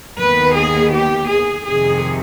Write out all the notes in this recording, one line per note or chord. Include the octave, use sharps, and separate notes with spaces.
D#2 D#3 B3 B4
G#4
G4
G#4
F2 C3 D#3 G#4